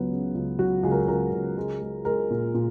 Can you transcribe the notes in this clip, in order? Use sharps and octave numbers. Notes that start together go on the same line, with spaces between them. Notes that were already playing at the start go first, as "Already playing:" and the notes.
Already playing: C#2 F#3 B3
C#3
C#2
F#3 F#4
C#2 G#4
A#4
G#4
C#2 A#4
C#2
G#3
G#3
G#3 A#4
A#2
A#2